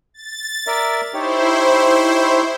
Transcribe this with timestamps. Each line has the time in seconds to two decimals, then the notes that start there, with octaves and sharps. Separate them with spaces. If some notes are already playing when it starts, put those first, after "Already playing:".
0.14 A6
0.67 A#4 D5 E5
1.14 D#4 E4 G4 C5 C#5